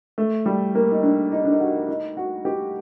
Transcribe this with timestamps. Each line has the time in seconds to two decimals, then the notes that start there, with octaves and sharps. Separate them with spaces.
0.18 A3
0.46 G3
0.75 A#3
0.92 D#4
1.03 D4
1.32 D#4
1.45 D4
1.52 D#4
1.60 F#4
1.89 D#4
2.17 F#4
2.45 G4